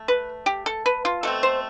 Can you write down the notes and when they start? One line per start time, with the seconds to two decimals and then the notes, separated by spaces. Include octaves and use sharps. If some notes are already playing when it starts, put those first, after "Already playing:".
Already playing: A3
0.08 B4
0.46 G4
0.66 A4
0.86 B4
1.05 F4
1.23 B2 A3 C4 A4
1.43 C5